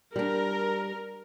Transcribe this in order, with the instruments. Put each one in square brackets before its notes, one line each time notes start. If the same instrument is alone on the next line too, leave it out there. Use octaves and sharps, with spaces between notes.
[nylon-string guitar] G3 D4 [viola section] A#4